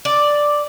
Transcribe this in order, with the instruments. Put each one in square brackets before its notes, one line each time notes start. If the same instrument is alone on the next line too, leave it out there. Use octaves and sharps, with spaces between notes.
[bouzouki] D5